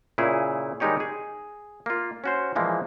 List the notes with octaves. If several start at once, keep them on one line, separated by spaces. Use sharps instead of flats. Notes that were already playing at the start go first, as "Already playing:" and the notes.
A#2 C#3 E4 G#4
D#3 G3 G#3 D#4 G4 C#5
G#4
A#3 F4
C#4 F#4 C5
A#2 E3 F3 G#3 A#3